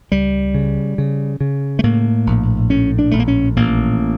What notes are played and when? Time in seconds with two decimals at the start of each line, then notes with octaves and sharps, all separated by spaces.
0.11 C#2 G3
0.54 C#3
0.98 C#3
1.41 C#3
1.79 A3
1.84 A2 A#3
2.27 A#1
2.70 A2 C#4
2.99 D4
3.11 A#1 A3
3.19 A#3
3.28 C#4
3.56 A1 A#3